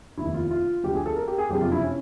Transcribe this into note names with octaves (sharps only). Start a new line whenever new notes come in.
F1 D#2 D#3 E4
F4
F4
D2 D3 F3 G4
G#4
A4
A#4
G4
G#4
F#1 F2 C3 G4
F4
E4
C#4